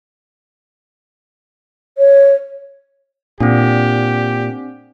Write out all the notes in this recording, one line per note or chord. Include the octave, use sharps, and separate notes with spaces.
C#5
A#2 C4 D4 G4